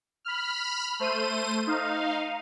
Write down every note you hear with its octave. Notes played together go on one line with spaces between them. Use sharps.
B5 F6
A3 C5 D#7
D#4 F5